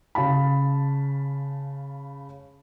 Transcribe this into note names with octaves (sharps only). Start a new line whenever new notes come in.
C#3 F5 A5 B5